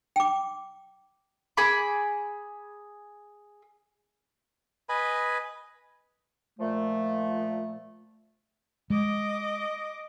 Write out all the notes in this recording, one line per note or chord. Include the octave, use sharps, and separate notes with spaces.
G5 D6
G#4 B5 D6
B4 D#5 G#5 B5
A#2 F3 A3
G#3 D#5 D6